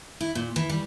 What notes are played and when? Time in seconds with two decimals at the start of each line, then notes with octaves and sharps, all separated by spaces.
0.21 E4
0.35 A#2
0.56 E3
0.70 G3